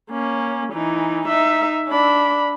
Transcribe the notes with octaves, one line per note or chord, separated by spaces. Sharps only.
A#3 C#4
E3 D#4
D#4 E5
D4 B5